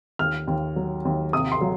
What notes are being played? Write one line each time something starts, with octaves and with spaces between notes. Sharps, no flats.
D#2 F6
D#2
F#3
D#2
C3 D#6
C6
F#3